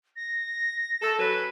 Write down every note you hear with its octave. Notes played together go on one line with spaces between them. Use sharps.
A#6
A4
F#3 C#4 B4